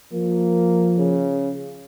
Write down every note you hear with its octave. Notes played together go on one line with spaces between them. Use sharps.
F3 A#3
C#3